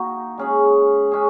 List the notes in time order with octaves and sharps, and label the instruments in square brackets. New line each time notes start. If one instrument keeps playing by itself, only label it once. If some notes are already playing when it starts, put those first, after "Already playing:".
Already playing: [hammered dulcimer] D#3 A#3 D#4 F#4 A#4
G#3 C#4 G#4
G#3 C#4 G#4